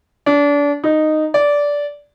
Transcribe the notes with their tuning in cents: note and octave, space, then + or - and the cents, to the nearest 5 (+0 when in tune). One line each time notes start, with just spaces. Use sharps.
D4 -30
D#4 -10
D5 -15